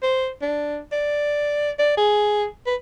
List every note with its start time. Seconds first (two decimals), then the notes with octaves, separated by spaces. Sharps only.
0.03 C5
0.42 D4
0.92 D5
1.79 D5
1.97 G#4
2.67 B4